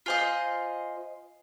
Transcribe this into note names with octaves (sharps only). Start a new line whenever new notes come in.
F4 C5 D#5 F5 G#5 C7